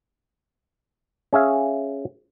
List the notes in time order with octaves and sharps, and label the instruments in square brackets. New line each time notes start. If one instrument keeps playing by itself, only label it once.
[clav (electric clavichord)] C#4 G#4 E5 F5